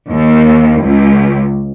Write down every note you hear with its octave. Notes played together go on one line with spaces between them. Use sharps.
D#2
C#2